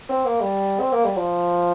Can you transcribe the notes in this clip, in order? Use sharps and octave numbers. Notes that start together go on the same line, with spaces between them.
C4
A#3
G3
C4
A#3
G3
F3